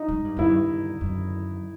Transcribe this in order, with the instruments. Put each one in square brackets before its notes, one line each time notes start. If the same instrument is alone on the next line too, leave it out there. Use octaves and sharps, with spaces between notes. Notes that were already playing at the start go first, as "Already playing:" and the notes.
Already playing: [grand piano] D#4
[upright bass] G#2
G2
[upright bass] F#2 [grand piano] E4
[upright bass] G2
F#2